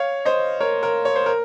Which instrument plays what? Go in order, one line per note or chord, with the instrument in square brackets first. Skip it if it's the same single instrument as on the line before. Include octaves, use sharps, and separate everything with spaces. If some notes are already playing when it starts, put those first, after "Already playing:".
Already playing: [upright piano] C#5 F5
C5 D#5
A#4 C#5
A#4
C#5
C5
A#4